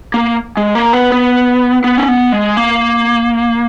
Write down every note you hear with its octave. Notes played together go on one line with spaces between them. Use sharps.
A#3
G#3
A#3
B3
B3
B3
C#4
B3
G#3
A#3